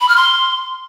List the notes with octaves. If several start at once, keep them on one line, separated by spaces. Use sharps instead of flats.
B5
F6
C6